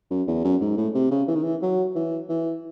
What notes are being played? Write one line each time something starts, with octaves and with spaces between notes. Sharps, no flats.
F#2
E2
F#2
G#2
A2
C3
C#3
E3
D#3
E3
F#3
E3
E3